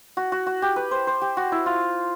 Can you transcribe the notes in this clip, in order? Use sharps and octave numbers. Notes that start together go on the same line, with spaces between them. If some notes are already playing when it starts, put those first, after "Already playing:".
F#4
F#4
F#4
G4
B4
C5
C5
G4
F#4
E4
F4